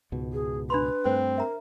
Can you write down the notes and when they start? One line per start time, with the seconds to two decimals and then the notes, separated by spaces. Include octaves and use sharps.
0.12 C#2 G#2 B2
0.33 G#4
0.70 D4 B4 B5 C6
1.05 G2 A3 C4 C5
1.38 A#4 E5 A#5